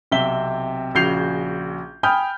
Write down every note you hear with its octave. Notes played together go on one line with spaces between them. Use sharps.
B1 C3 C4 E5 B6 G7
A#1 C#3 F#4 G6 C7 F7
G5 G#5 B5 D#6 F6 G6